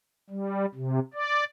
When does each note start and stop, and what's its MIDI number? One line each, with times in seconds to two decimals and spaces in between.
0.30 0.66 55
0.75 0.99 48
1.14 1.44 74